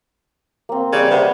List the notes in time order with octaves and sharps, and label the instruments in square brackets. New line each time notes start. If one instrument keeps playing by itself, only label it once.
[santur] A#3 C4
[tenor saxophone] C#3 [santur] G3 D#5
[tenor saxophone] C3 [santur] B4 F#5